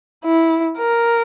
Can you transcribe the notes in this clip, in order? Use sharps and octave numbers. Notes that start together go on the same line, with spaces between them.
E4
A#4